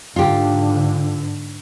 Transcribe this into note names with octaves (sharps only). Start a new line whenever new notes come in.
G#2 D3 F4 G4